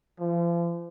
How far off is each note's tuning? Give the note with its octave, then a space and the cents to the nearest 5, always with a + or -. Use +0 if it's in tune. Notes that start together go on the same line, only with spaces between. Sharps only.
F3 -40